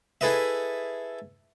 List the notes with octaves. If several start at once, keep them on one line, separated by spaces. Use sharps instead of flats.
E4 G#4 A4 B4 D#5 E5